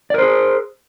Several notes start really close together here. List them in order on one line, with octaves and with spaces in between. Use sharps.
D5 A#4 C5 G#4